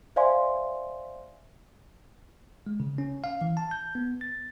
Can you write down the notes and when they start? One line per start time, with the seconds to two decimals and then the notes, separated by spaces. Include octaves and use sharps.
0.16 C5 D5 E5 F5 G#5 C6
2.67 G#3
2.80 C#3
2.98 C#4
3.24 F5
3.41 E3
3.57 A5
3.71 G6
3.95 B3
4.21 A6